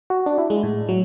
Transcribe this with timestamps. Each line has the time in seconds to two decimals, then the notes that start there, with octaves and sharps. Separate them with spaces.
0.10 F#4
0.26 D4
0.38 E4
0.50 G#3
0.63 A2
0.89 F#3